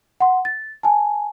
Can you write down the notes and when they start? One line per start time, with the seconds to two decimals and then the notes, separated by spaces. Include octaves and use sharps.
0.20 F#5 C6
0.45 A6
0.83 G#5 A5